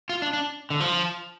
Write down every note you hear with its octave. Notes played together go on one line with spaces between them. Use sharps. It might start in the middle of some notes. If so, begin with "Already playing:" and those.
F4
D4
D4
D3
F3